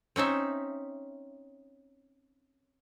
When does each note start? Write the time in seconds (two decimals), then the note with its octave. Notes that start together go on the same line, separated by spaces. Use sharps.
0.16 C4 C#4 D#4 E5